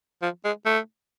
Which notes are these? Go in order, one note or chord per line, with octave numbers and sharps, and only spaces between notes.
F3
G#3
A3